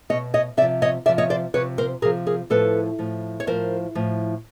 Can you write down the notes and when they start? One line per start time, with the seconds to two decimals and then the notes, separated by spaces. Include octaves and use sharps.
0.09 B2 C#5 D#5
0.34 C#5 D#5
0.57 C3 D5 E5
0.62 F3
0.82 C#5 D#5
1.06 C3 F3 D5 E5
1.18 C#5 D#5
1.30 C5 D5
1.54 C3 F3 B4 C#5
1.78 A#4 C5
2.02 C3 G#4 A#4
2.05 F3
2.27 G#4 A#4
2.50 A2 F3 A4 B4
2.99 A2 F3
3.40 C#5
3.47 A2 F3 A#4 C5
3.95 A2 F3